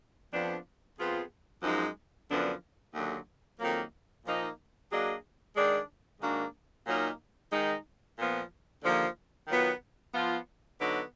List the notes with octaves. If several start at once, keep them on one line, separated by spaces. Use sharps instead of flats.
F2 F3 B3 D4
F2 F3 B3 F4 G#4
F#2 F3 G#3 D#4
F#2 D3 F3 B3 D4
D#2 D3 F#3
F2 D#3 F#3 A#3
A#2 F3 A#3 D#4
F#3 A#3 D4 G#4 D#5
D#3 G#3 D4 G#4 D5
G#2 D#3 A#3 D4 F#4
A#2 F#3 A#3 D#4 A#4
D#3 G#3 D#4
A#2 F3 B3
D#2 D3 F3 A#3
D#3 F#3 B3 F4
F3 B3 F4
D3 F#3 B3 D#4 F#4